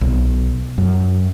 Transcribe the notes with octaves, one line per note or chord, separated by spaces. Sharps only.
B1
F#2